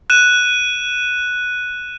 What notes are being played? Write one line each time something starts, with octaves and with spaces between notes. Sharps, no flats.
F#6 D#7 E7